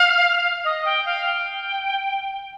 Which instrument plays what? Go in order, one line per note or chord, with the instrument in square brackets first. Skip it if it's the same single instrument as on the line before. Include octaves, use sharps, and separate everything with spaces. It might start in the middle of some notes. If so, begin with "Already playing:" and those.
Already playing: [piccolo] F5
D#5
G5
F5
G5